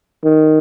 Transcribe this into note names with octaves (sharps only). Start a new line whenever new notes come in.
D#3